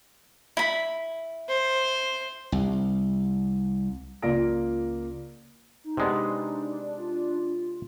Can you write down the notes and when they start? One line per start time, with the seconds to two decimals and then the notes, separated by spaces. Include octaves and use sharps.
0.57 E4 B5
1.49 C5
2.52 C2
4.22 C#2 A#3 F4 D5 A#6 D7
5.84 D#4
5.97 C3 G#3 B3 D4
6.97 F4